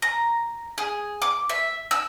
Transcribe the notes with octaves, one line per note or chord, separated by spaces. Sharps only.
A#5
G#4
D6
E5
E6